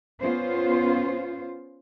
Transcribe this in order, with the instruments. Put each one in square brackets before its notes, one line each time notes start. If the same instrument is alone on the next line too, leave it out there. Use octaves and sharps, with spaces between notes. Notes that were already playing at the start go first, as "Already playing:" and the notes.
[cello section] B3 C#4 F4 C5